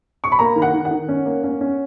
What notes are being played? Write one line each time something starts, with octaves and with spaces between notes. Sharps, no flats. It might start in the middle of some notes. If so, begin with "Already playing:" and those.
C#6
B5
A#3 A#5
D#3
F#5
D#3
F#5
D#3
C#4
A#3
C#4
C#4